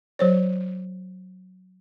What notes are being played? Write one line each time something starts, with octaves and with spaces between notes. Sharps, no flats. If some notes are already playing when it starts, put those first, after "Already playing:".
F#3 C5 C#5